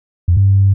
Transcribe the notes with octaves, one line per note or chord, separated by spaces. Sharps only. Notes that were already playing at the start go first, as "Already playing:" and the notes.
F2
G2